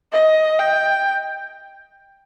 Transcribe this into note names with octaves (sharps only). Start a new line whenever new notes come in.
D#5
G5